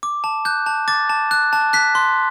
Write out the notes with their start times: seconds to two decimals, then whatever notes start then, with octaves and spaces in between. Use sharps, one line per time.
0.03 D6
0.24 A5
0.45 F#6 G6
0.66 A5
0.88 D6 A6
1.09 A5
1.31 F#6
1.53 A5
1.73 F#6 B6
1.95 C6